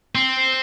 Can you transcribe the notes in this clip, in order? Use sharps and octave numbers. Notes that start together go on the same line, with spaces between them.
C4